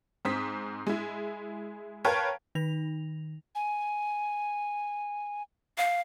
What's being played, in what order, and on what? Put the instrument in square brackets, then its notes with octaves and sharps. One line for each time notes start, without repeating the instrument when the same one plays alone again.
[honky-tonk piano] G#2 C4 D#6 B6
G#3 E4
A#4 B4 C#5 F5 G5 A5
[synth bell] D#3 D#4 A#6 F7
[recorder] G#5
[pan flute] F5